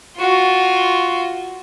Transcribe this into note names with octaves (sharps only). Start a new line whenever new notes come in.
F4 F#4